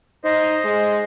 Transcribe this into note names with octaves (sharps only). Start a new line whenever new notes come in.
D#4 C5 D#5
G#3